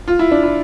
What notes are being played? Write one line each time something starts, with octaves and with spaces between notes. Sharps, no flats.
F4
E4
D4
E4